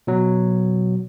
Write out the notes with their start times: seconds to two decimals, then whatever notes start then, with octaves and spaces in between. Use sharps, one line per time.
0.07 B2 F#3